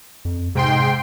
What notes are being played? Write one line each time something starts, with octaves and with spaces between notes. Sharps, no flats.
F2
G#2 C3 G5 C6